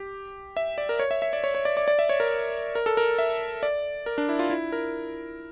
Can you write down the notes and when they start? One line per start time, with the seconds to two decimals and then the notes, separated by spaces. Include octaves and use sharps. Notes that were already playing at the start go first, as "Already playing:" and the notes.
Already playing: G4
0.57 E5
0.78 D5
0.89 A#4
0.99 C#5
1.11 E5
1.22 E5
1.33 D5
1.44 C#5
1.55 C#5
1.65 D5
1.77 D5
1.88 D5
1.99 E5
2.09 C#5
2.20 A#4
2.75 A#4
2.86 A4
2.97 A#4
3.18 E5
3.63 D5
4.06 A#4
4.18 D4
4.29 E4
4.39 F4
4.50 E4
4.72 A#4